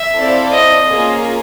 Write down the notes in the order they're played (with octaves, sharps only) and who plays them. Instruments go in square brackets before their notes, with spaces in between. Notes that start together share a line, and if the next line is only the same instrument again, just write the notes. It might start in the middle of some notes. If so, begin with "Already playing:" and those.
Already playing: [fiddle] E5
[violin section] C4 E4 A4 D5 F5
[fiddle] D#5
[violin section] A#3 C#4 F4 G#4